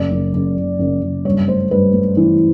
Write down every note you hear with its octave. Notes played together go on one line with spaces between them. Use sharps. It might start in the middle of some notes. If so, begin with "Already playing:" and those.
Already playing: F#1 D5
F#1
F#1
F#1
F#1
F#1
G2 C#5
A3 C5
G2 B4
A3
E3